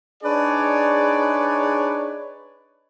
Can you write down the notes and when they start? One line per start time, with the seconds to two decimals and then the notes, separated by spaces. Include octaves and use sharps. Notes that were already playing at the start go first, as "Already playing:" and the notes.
0.23 D4 D#4 G#4 B4 C#5 D5